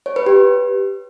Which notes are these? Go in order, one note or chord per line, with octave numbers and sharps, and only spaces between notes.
C#5
B4
G4